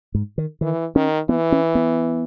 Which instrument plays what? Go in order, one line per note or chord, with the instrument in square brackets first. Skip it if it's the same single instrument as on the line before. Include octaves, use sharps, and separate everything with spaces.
[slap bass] G#2
D#3
[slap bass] D#3 [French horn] E3
[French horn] D#3 [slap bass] C#4
[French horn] E3 [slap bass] B3
[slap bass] C#4
B3